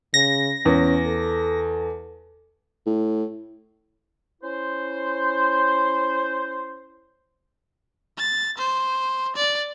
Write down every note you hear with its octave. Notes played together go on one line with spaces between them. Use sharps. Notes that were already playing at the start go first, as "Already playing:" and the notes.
C#3 A#6
E2 C#4
A4
A2
C#4 E4 C5
A6
C5
D5